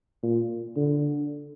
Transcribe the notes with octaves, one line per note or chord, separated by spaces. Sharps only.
A#2
D3